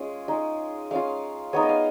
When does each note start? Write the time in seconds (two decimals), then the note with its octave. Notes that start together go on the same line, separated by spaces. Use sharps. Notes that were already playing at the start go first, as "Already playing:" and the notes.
Already playing: G#3 C#4 F4 G#4
0.28 G#3 D#4 G#4
0.91 G#3 C#4 F4 F5
1.53 G#3 B3 D#4 C#5
1.63 D#5
1.69 F5